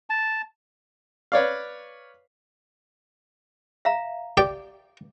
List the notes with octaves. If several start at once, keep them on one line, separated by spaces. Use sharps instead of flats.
A5
B4 C#5 D5 F5
E5 F5 A#5
G4 D5